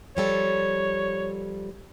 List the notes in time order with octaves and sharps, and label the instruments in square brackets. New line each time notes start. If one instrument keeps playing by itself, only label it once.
[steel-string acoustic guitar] F3 G3 A4 [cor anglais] C#5